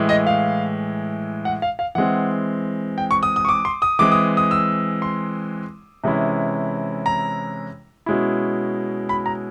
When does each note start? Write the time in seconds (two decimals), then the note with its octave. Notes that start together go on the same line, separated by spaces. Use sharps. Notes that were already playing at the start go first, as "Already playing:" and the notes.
Already playing: A2 E3 G#3
0.09 D#5
0.27 F5
1.45 F#5
1.62 F5
1.79 F5
1.95 E3 G#3 C4 F#5
2.98 G5
3.11 C#6
3.23 D#6
3.36 D#6
3.45 C#6
3.49 D6
3.65 C6
3.82 D#6
3.99 E3 G#3 C4 D6
4.12 D#6
4.37 D#6
4.51 E6
5.02 C6
6.04 C3 E3 G#3 C#4 E4
7.06 A#5
8.06 B2 G#3 C#4 E4
9.09 B5
9.26 A#5